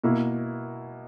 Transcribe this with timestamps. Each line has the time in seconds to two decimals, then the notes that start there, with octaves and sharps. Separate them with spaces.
0.04 B2 A#3 E4